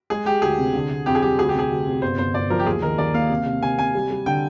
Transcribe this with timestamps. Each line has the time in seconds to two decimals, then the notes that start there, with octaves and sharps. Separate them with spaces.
0.10 G#3 G#4
0.26 G#3 G4
0.42 D2 G#4
0.59 C3
0.74 D3
0.91 D3
1.06 F2 G4
1.15 G#4
1.22 G3 G4
1.38 D2 G#4
1.49 G4
1.54 C3 G#4
1.70 D2
1.87 C3
2.02 G1 C5
2.18 G1 C5
2.34 G1 D5
2.50 F3 A#4
2.59 G4
2.66 D#2 G#4
2.82 D#3 A#4
2.98 D#2 D5
3.14 A#3 F5
3.30 C3
3.46 C3
3.62 C3 G#5
3.78 C3 G#5
3.95 G3
4.11 G3
4.26 D3 G5